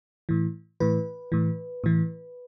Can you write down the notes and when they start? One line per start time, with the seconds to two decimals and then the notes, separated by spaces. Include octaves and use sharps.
0.29 A2 E3
0.80 A2 E3 B4
1.32 A2 E3
1.84 A2 E3